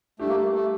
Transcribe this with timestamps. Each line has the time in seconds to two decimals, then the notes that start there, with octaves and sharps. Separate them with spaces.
0.19 G3 A3 D4 G4
0.29 A#3
0.36 A3
0.54 A3